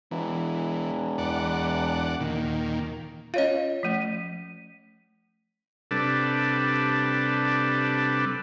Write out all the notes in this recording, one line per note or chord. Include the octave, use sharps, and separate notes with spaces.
E1 E3
E2 D5 F#5
D#2 A#2 D#3
C#4 F4 C#5 D#5 F5
F3 A3 B6 D#7
C3 G3 D4 A4 B4